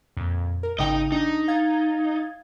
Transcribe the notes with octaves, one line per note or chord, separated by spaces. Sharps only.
F2 A#2
A#4
G#1 C#3 D#4 D#5 G5
D4 D#4
F5 G#6 A6